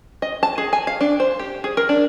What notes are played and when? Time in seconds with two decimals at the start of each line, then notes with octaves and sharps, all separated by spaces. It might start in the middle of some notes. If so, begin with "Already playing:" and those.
0.22 D#5
0.43 A5
0.58 G#4
0.73 G#5
0.87 F5
1.01 D4
1.20 C5
1.39 G4
1.64 G#4
1.77 A#4
1.89 D4